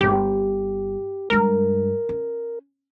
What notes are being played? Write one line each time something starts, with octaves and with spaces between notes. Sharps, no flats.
G1 G4
G2 G#3 A#4
C#4